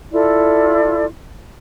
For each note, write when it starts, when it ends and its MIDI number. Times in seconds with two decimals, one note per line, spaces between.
0.12 1.05 64
0.12 1.05 65
0.12 1.05 69
0.12 1.05 74